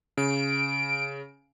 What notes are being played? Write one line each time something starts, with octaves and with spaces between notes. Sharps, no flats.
C#3 D7